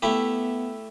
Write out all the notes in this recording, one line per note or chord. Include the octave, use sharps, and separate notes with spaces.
A3 B3 E4 G4